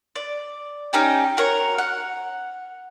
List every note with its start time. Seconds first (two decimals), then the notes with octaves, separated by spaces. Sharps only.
0.16 D5
0.93 C#4 D#4 G4 G5
1.37 F#4 A#4 C#5
1.78 F#5